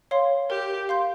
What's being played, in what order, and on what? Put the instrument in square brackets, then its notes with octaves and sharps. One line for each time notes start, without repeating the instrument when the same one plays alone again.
[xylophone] C#5 F5 C6
[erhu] G4 [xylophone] A#4
[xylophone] F5 C6 G6